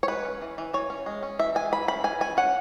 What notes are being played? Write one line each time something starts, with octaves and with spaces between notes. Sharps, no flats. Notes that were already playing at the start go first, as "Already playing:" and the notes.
C#5
G#3 B4
C#4
E3
E3
E3 C#5
C#4
G#3
C#4
E3 E5
G#3 G#5
E3 B5
C#4 B5
E3 G#5
C#4 G#5
C#4 F#5